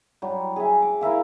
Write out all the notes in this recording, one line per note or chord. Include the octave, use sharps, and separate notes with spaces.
F#3 G3
G#4 E5
D6
E4 A#4 E5 F5